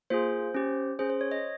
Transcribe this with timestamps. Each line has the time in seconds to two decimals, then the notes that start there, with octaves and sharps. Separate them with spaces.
0.10 A#3 F4 G#4 C5
0.54 C#4 G4
0.99 C#4 G#4 C5
1.10 C5
1.21 C#5
1.31 D#5